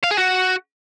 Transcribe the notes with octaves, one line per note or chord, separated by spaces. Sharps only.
F5
G#4
F#4